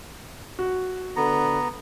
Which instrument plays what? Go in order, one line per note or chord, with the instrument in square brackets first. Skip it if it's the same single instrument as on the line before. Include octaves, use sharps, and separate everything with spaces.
[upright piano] F#4
[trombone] D3 [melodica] B3 A#5